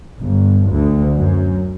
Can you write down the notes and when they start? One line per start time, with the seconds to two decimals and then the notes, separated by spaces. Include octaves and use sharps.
0.21 G1
0.72 D2
1.17 F#2